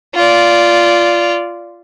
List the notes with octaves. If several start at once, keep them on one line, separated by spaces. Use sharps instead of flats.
F4 D5